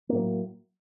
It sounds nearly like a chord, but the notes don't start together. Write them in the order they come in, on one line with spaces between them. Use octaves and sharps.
A#3 A2 F#3